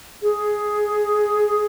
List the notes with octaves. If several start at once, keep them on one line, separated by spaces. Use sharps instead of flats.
G#4